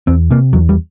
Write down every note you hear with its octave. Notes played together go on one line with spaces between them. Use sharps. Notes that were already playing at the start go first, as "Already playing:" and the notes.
E2 C4
C3 A#3
E2 F#3
G3